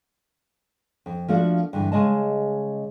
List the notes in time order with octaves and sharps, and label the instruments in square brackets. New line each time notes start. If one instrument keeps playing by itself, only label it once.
[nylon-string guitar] F2
F3 A3 A#3 D4 F#4
G2 D3 E3
C#3 G#3 D#5 A5